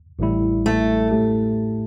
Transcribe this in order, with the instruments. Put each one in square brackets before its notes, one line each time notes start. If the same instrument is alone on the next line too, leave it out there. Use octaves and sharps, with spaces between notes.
[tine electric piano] A1 A2 G3 E4
[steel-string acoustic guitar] A3
[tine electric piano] A2 A3 G4